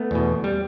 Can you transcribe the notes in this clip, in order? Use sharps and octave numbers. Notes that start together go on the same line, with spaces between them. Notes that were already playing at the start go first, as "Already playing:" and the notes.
Already playing: A3 B3
E2 B2
G3